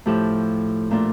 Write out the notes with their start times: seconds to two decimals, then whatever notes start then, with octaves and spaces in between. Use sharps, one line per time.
0.06 A2 F3 A3 E4 G4
0.91 A#2 A3 D4 F4